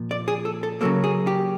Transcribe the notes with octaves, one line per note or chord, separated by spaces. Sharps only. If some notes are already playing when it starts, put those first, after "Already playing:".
Already playing: A#2 F3
D5
G#4
A4
A4
C#3 F#3 A#3 A4
G#4
G4